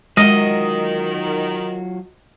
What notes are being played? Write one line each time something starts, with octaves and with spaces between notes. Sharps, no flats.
D#3 F#3 G#3 F4 F#4 D#5